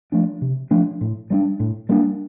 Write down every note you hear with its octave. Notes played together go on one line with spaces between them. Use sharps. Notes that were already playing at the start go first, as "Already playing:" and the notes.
F3 A3 D4
C3
F3 A3 D4
A2
G3 A#3 D4
A2
G3 A#3 D4